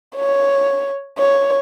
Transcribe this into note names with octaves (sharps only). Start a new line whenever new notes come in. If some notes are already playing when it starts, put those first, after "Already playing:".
C#5
C#5